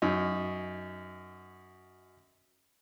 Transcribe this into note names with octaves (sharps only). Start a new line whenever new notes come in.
F#2 D#4